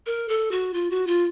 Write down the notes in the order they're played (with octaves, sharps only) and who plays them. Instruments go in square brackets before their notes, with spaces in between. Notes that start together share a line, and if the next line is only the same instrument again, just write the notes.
[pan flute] A#4
A4
F#4
F4
F#4
F4